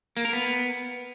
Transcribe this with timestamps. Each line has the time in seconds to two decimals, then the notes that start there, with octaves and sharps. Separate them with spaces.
0.17 A#3
0.25 A#4
0.33 B3